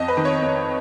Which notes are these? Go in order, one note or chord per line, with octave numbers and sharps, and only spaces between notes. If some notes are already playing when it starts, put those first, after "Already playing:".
Already playing: F2 D#5
B4
D#3
C#5
F2